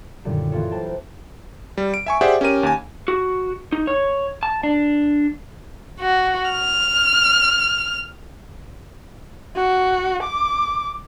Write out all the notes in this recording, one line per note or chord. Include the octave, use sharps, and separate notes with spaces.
F#2 A#2 D3 D#3 G3
E3 A#3 F4 A4 C#5
B4 C5 G5 A5 A#5
G3
D7
E5 G#5 C#6
G4 G#4 C5 D5 E5 F#5
C#4 G4 A#4 D#7
D#2 G#5
F#4
D#4
C#5
A5
D4
F#4
F6
F#4
D6